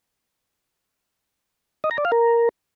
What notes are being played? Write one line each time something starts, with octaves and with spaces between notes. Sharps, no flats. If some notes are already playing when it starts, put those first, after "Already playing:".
D#5
A#5
D5
F5
A#4